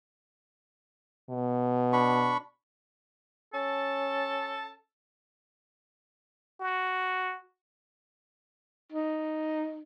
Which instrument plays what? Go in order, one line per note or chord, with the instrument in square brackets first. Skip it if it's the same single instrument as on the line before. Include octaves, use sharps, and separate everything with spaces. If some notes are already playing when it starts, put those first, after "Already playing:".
[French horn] B2
[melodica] D4 B5 C#6
[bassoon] C#4 [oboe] A4 [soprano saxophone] A5
[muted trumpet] F#4
[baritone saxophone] D#4